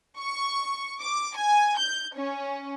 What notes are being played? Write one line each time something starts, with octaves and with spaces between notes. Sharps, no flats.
C#6
D6
G#5
G6
C#4